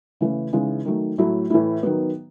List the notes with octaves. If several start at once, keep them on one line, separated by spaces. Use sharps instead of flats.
C#3 E3 A3 C#4
C#3 E3 G#3 D#4
D#3 F#3 A3
A2 F#3 A3 E4
A2 E3 A3 E4
D#3 F#3 B3